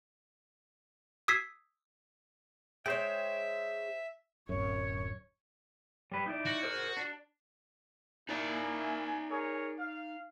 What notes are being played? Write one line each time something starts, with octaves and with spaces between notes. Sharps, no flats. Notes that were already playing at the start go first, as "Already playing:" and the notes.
D#6 E6 G#6 B6 C7
G#3 C5 C#5 E5 G5
D1 F#2 C#5
G3 B4
D#4 E4 D5
F#4
G#4 A#4 C5
D4
A#3 D#4 E4 D5 G#5
G#4 A#4 C#5
F5